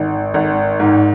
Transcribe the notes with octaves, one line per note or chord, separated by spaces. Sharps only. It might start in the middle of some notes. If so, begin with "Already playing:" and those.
Already playing: G#1
G#1
G#2